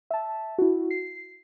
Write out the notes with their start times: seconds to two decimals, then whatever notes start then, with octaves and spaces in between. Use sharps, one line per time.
0.10 E5 A5
0.58 E4 F#4
0.91 C7